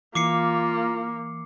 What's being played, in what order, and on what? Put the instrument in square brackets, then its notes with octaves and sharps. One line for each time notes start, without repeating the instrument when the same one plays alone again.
[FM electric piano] E3 [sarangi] A#3 [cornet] F4 [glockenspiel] D6 C7 C#7